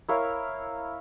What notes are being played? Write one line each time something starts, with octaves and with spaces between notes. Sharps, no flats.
E4 A#4 C#5 F5